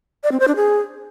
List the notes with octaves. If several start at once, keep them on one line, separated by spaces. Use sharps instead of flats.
D5
C4
C5
D4
G#4